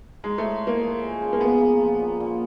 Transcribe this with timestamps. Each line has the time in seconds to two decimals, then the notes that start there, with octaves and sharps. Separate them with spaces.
0.23 G#3 D#4
0.38 A2 A3
0.62 A#3 D#4
0.83 F3
1.02 G#3
1.22 C#3
1.33 A#3
1.41 C#3 B3
1.61 A#3
1.80 F3
2.00 A#2
2.20 A#2